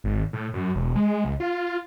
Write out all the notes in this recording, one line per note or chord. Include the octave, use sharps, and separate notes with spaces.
G#1
A2
F#2
E1
G#3
C#2
F4